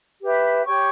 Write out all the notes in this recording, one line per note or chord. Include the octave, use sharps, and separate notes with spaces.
G4 B4 E5
G4 C#5 G5 C#6